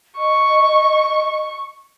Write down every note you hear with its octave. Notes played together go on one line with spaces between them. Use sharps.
D#5 C#6